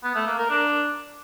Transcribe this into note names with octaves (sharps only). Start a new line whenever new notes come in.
B3
A3
A#3
A#4
D4